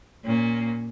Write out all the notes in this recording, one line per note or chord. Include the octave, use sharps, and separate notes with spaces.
A#2 C#4